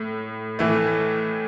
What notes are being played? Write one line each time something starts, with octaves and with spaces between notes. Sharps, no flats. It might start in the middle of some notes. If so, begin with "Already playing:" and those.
Already playing: A2
A2 E3 A3